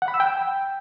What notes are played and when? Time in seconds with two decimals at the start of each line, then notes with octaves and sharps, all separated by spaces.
0.02 F#5
0.08 B5
0.14 E6
0.20 G5